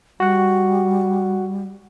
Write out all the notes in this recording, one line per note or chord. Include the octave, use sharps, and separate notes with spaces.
G3 F#4 F#5